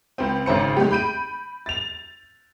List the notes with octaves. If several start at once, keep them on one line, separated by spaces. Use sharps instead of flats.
C#2 C4
G#1 C#3 C5 C#7
G#3 A3 G4
B5 G6 D7 D#7
A6 F7